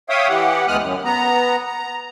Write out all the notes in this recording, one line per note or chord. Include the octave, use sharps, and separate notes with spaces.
C#5 E5 F5 G5 D#6
E3 G4 F#5
D2 G#3 B3 D#6 F6 F#6
F#2
B3 A#5
A#5